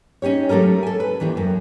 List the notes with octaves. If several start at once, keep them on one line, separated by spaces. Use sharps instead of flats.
C#4 D#4 G4 C#5
F#3 A3 G4 A4 A#4
A4 G#5
B4
D#2 E3 D4 G4
F#2